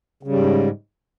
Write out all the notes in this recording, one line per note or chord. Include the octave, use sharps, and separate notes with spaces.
G#2 C#3 G3